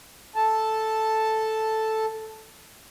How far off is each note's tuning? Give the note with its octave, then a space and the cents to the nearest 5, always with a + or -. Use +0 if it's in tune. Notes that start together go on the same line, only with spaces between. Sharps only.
A4 +0 A5 +0